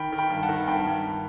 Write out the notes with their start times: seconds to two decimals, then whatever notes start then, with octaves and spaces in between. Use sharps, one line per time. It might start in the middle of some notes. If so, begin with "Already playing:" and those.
Already playing: D#3 G5 B5
0.13 D#3
0.18 G5 B5
0.30 G2
0.43 F#5 A5
0.49 D#3
0.67 G2 G5 B5
0.86 G2